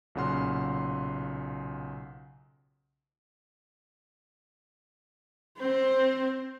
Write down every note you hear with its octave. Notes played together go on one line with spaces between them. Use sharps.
B1 A#2 C#3 F#5 C6 F6
C4 C5